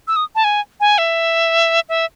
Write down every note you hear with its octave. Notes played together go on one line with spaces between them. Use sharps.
E6
D#6
A5
G#5
G#5
E5
E5